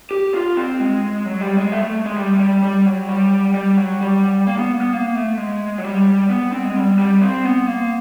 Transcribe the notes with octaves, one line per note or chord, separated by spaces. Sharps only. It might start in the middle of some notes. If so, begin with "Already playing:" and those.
G4
F4
C4
G#3
F#3
G3
G#3
A3
A3
G#3
G3
G3
G3
F#3
G3
G3
F#3
G3
A#3
B3
B3
A#3
A3
G#3
F#3
G3
B3
C4
G#3
G3
G3
C4
B3
A#3